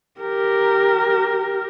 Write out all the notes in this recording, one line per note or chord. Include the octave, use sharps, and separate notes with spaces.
G4 A#4